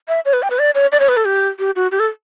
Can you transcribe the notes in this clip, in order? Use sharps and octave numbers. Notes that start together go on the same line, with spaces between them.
E5
C#5
B4
G5
B4
D5
C#5
D5
C#5
B4
A4
G4
G4
F#4
G4
A4